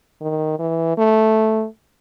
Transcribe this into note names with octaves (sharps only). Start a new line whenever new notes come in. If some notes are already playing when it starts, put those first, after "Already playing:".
D#3
E3
A3